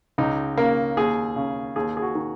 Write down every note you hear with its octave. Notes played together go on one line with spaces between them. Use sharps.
C#2 D#4
C#3 A#3
D#2 G#4
C#3
D#2 G#4
G#4
F#4
D#3